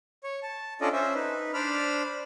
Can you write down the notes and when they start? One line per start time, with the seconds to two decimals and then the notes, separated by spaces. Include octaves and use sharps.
0.24 C#5
0.43 A5
0.81 C#4 D4 F4 A4 D5 D#5
0.93 C#4 C5 E5
1.15 D#4 B4
1.54 D4 C5 D5 B5 F6